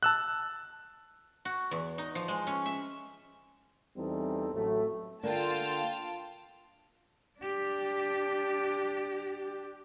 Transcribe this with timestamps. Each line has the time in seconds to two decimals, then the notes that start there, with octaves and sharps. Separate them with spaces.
0.03 A5 E6 F#6
1.45 F#4
1.71 E2
1.98 D#4
2.15 F3
2.28 G#3
2.47 C#4
2.66 E5
3.97 E2 E3 G3 C4 D#4 A4
4.54 A1 A2 F#3 A3
5.23 D3 A#3 F4 G5 A5
7.39 D4 G4